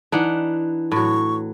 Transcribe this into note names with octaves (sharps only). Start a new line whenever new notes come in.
E3 D4 D#4 F#5
A2 F#3 C#6